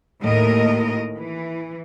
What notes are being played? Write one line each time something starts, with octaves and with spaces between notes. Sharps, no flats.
D#2 A2 A#4 D#5
E3